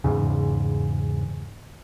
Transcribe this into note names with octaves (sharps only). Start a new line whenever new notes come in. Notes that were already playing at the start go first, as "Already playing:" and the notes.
E2 G#2 C#3